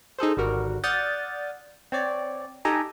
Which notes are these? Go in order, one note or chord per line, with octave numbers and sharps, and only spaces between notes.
D#4 G#4 A4 C5
G#1 D3 G3 F#4 A#4
D5 F#5 D#6 F6 G6 A6
C4 C#5 D5
D#4 G4 A4 D#5 G#5 A#5